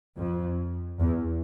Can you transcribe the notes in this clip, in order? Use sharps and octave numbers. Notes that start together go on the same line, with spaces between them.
F2
E2